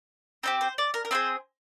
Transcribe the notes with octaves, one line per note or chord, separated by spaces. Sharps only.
C4 D#4 G4 C5
C5
D5
A#4
A#4
C4 F4 G#4 C5